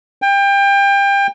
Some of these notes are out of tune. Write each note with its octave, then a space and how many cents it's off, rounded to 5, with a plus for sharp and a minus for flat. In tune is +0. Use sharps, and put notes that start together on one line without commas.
G5 +25